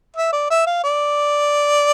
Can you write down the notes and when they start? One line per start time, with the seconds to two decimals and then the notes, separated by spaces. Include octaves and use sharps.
0.16 E5
0.33 D5
0.50 E5
0.67 F5
0.84 D5